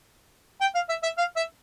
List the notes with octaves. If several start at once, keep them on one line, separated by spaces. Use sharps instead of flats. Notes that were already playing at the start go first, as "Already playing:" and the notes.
G5
F5
E5
E5
F5
E5